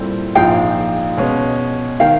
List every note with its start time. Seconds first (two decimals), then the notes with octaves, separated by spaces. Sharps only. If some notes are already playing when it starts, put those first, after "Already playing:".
Already playing: A#2 G3 C4 E4 A4
0.35 A#1 G#2 F3 G#3 F5 G5
1.17 B2 G#3 C#4
2.00 D#3 F5 G5